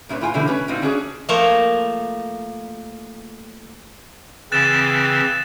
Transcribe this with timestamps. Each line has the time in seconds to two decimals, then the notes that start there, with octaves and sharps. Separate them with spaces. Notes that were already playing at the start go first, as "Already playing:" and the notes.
0.09 A#2 E4 F4 B4 C#5
0.21 A2 F4 G5 G#5
0.34 B2 D3 E3 G3 A3 D4
0.46 C#4 B4 C#5
0.68 A2 C4 D4 D#4 F4 F#4
0.82 C#4 D4 F#4 G#4 C5 C#5
1.29 F3 A3 A#3 A#4 C5 C#5
4.52 C#3 E3 C4 F#6 A6 E7